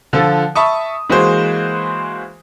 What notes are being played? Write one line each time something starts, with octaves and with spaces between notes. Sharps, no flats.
D3 F3 F4 A4
E5 A5 B5 C#6 D#6
E3 G#3 A#3 F#4 G#4 C5